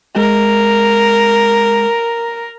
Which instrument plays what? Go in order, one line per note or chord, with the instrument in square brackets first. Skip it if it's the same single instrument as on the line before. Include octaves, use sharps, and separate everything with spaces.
[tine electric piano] G#3 [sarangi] A#4